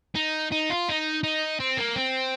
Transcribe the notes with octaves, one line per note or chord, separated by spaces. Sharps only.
D#4
D#4
F4
D#4
D#4
C4
A#3
C4